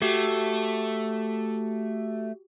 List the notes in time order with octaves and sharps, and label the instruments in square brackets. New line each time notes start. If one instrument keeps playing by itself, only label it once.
[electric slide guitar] A3 [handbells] F#4 G4